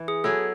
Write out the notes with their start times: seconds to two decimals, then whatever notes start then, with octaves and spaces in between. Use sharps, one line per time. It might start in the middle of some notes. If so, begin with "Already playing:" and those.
Already playing: E3
0.08 G#4
0.24 F#3 B3 E4 G#4 A4